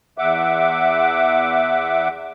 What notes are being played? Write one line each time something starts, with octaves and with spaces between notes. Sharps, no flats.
E2 E5 F#5 D6